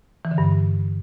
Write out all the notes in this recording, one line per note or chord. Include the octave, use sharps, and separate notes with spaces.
E3
D3
G2